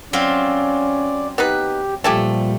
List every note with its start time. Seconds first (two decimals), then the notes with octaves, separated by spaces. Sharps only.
0.13 F#3 C4 C#4 F4 D5
1.38 B3 D#4 G4 B4
2.04 A#2 F3 G3 A3 G4 G#5 A5